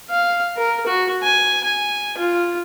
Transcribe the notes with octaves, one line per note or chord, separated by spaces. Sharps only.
F5
A#4
F#4
G#5
G#5
F4